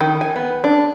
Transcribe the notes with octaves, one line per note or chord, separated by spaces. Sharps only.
D#3
G#5
B3
D4